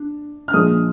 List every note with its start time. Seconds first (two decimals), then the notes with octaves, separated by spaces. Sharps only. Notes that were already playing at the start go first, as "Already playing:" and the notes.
Already playing: D4
0.48 F6
0.53 A#2 F3 G#3 D4 D#6